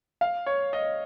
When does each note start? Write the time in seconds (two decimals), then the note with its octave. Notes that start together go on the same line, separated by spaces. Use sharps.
0.21 F5
0.46 C#5
0.73 D#5